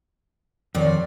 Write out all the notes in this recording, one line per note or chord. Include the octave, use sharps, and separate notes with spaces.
F2 A#2 D#3 C#5 D5